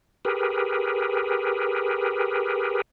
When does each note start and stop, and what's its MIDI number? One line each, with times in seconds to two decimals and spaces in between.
0.25 2.82 67
0.25 2.82 68
0.25 2.82 70
0.25 2.82 71